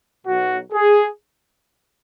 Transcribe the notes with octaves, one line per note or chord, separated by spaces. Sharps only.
B1 B2 F#3 F#4
G#4